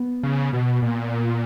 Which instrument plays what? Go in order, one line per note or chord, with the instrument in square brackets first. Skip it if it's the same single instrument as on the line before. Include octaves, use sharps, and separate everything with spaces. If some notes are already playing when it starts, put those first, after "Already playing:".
Already playing: [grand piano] B3
[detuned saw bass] C#3
B2
A#2